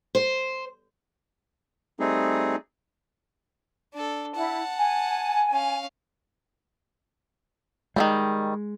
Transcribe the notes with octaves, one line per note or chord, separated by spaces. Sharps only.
C5
G3 A3 C4 D#4 G#4
D4 A4
E4 F#5 A5
G#5
C#4 F5
D#3 F3 G3 G#3